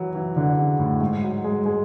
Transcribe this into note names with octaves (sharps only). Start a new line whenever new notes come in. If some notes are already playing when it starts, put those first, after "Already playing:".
Already playing: E3 F#3
E3
D3
C#3
A2
G#2
F#3
G#3
G#3